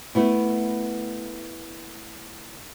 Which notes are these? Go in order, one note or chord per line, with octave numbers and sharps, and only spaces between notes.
A3 B3 E4